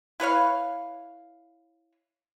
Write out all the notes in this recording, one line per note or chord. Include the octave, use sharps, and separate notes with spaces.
E4 B4 C#5 F5